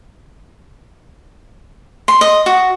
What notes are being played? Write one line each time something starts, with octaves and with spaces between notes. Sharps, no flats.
C6
D#5
F#4